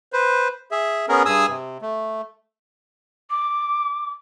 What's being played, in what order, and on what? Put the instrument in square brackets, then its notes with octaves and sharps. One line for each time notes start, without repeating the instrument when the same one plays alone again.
[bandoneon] B4 C5
G#4 E5
B3 C#4 G#4 A#4
G2 G#4 G#5 D#6 E6
C3
A3
[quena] D6